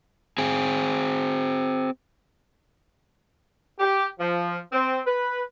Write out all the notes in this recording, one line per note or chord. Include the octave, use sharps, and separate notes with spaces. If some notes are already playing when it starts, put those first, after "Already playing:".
C4 G#4
G4
F3
C4
B4